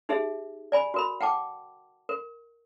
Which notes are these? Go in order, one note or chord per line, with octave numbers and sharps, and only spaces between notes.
D#4 G4 G#4 E5
D5 G#5 B5
F#4 A#4 B5
F#5 G5 A5 D6
A#4